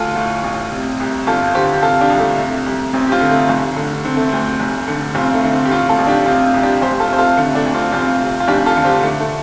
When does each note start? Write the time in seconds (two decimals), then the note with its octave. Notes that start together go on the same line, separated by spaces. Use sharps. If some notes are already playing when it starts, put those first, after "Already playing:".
Already playing: D2 F4 A4
0.16 A2
0.44 A1
0.72 C3
1.00 C2
1.27 G1 F4 A4
1.55 D3 G4 C5
1.73 G4
1.82 C3 F4 A4
2.01 D4 G4
2.10 C2
2.20 A3
2.38 C3
2.66 C2
2.93 A1 C4
3.07 G4
3.12 C4 F4
3.21 D3
3.31 A3
3.49 F1
3.76 D3
4.05 D3 C4
4.17 A3
4.29 D2 C4
4.60 F1
4.88 D3
5.15 F1 C4 F4
5.34 A3
5.44 D3
5.52 C4
5.65 G4
5.71 A2 C4 F4
5.89 F4 A4
5.99 A1
6.07 D4 G4
6.26 C3 C4 F4
6.54 C2
6.63 D4 G4
6.81 F1 G4 C5
7.00 F4 A4
7.09 C3 C5
7.19 F4 A4
7.37 D3 A3
7.55 A3 D4
7.65 D2
7.74 C4 F4
7.92 F1 C4 F4
8.20 C3
8.40 F4
8.48 F1 D4 G4
8.66 F4 A4
8.76 D3
8.85 G4 C5
9.03 D3 A3
9.21 A3